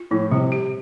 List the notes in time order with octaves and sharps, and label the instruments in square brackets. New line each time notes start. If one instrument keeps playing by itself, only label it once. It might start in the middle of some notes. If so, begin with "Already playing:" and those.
Already playing: [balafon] F4
[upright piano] A2 [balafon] F3
[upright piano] C3 [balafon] G3
[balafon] G4